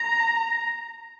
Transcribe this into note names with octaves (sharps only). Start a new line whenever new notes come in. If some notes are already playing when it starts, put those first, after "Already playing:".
Already playing: A#5